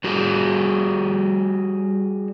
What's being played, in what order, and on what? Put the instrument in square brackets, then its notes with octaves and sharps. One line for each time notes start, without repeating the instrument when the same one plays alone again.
[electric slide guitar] G3 F#4 G#4